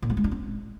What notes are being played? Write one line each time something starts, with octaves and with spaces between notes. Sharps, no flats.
A#2
G3
G#3
D4
C4